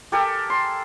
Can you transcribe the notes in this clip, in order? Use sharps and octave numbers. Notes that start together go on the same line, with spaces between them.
G4 A4 A#4 G#5
C6